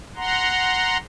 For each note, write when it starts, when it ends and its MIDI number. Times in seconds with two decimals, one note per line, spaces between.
0.17 0.97 78
0.17 0.97 82
0.17 0.97 84